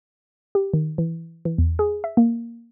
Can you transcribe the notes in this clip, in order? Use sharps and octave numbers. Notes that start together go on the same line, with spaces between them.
G4
D#3
E3
E3
E2
G#4
E5
A#3